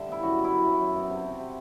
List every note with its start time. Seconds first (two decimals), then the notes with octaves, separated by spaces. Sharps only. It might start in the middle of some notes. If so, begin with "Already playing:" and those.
Already playing: D3 G3 E5
0.08 B3 E4
0.22 F#2 F#4
0.38 B3
0.44 E4
0.53 F#2
0.66 F#3
0.81 F#2
0.95 B3
1.10 C3
1.26 C4
1.39 C3